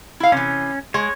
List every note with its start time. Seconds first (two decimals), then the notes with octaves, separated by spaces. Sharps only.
0.20 E4 F5
0.32 C3 E3 C#4
0.94 G#3 C#5